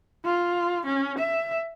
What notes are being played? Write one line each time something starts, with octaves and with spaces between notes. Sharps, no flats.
F4
C#4
E5